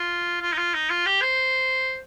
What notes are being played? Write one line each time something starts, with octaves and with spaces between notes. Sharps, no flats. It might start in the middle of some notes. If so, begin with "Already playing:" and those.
Already playing: F4
F4
D#4
F4
D#4
F4
G4
C5